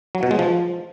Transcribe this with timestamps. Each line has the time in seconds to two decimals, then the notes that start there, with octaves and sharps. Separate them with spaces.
0.15 F#3
0.23 B2
0.31 G#3
0.39 F3